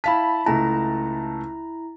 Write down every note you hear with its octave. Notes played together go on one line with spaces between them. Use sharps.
E4 F5 A5 B5 B6
C#2 A3 E4 A5 A#5